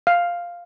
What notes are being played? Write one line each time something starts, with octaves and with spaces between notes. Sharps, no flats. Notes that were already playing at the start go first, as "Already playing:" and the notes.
F5